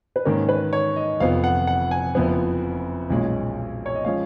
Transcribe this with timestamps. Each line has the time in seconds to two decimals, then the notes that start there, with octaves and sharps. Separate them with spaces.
0.16 B4
0.25 G#2 D#3 A#3 C#4 A#4
0.49 B4
0.73 C#5
0.96 D#5
1.20 F1 F2 F3 B3 F5
1.44 F#5
1.67 F#5
1.91 G#5
2.15 F#1 F2 F3 B3
3.10 B1 A#2 G#3 C#4
3.86 C#5
3.95 D#5
4.05 F3 G#3 C#4 F5